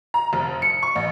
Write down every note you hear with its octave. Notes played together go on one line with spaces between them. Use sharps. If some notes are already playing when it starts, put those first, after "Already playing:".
A#5
F1
C#7
C#6
A1